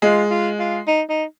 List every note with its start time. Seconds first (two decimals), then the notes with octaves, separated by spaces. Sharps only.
0.02 G#3 F4
0.30 F4
0.59 F4
0.87 D#4
1.09 D#4